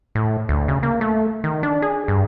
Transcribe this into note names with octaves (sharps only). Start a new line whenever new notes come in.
A2
D2
C#3
A#3
A3
D#3
D4
G#4
G2